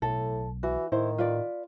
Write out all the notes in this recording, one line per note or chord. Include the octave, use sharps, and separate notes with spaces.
B1 A2 A4
E3 F#4
A2 D#3 E4 C5
F4 B4 D5